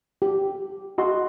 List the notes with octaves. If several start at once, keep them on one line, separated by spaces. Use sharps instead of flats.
G4
F#4 D#5 C6